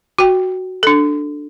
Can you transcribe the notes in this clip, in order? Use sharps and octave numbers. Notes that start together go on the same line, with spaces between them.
F#4 G5
D4 A4